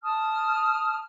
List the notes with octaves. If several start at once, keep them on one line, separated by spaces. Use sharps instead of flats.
A5 D#6 F6